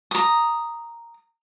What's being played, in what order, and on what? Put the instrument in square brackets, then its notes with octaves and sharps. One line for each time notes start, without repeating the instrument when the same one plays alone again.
[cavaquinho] A#5 D#6